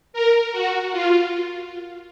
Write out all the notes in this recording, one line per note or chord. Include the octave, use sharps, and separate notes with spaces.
A#4
F#4
F4